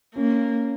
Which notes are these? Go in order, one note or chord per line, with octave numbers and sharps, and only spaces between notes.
A#3 C#4